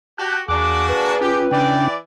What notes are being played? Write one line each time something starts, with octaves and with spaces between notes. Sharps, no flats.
F#4 G4 A5 F#6 G6
E2 A#3 D4 F#4 G#4 D6 F#6
B4
C#4 F4 G4
C#3 E3 C#4 D4 D5 G5